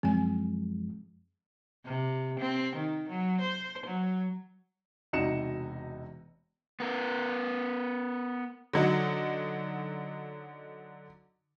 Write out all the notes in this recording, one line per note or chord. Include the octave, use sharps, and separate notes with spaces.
F#2 F3 G#3 C4 G#5
C3
C4
D#3
F#3
C5
F#3
E1 C3 D#4 F#4 C#7 E7
B3 A#4
D3 F#3 D#4 F#4